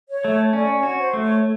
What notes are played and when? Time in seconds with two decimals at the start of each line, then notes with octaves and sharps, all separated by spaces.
0.09 C#5
0.24 A3
0.53 C#4 D5
0.76 C#5
0.83 F#4
0.99 C5
1.13 A3
1.21 C#5